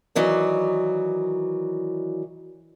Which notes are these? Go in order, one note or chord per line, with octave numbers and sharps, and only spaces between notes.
D#3 E3 F#3 D5